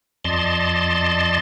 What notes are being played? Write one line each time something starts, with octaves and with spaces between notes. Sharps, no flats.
F2 D5 D#5 A5 C6